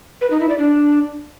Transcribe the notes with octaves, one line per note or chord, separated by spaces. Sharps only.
B4
D#4
E4
D5
D4